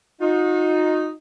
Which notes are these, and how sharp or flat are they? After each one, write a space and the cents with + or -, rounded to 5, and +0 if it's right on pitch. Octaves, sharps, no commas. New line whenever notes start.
D#4 +0 F#4 -45